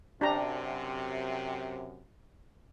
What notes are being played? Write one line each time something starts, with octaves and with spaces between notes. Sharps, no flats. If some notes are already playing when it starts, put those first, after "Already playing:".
F#2 C3 D4 G4 A#5